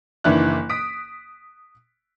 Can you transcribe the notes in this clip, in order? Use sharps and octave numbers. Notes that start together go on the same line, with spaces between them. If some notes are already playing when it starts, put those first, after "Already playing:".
F#1 D#3 E3 D4 E4 F#6
D#6 B6 D7